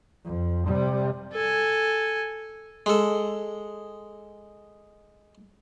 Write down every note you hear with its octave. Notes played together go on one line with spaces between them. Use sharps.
F2
C3 G3
A4 G#5
G#3 A4